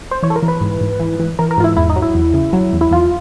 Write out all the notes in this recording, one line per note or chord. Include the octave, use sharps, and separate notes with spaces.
C5
E3 C#5
A4
A#4
E3
B4
G#2
G#2
E3
E3
E3 A#4
A#4
G#2 F4
E4
E2 E4
D#4
F#3
E4
E2
C#3
F#3
E2
E4
E2 F4